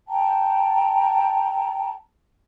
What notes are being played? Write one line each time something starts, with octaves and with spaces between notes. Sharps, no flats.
G5 A5 A#5